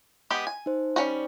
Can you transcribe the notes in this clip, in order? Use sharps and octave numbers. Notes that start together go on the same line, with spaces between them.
G#3 B3 G4
G#5
D#4 C5
G3 C#4 F#4